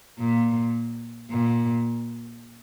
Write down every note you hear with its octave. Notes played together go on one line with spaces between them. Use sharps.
A#2
A#2